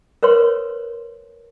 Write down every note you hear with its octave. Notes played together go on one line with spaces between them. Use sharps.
A#4 B4 C#5 C6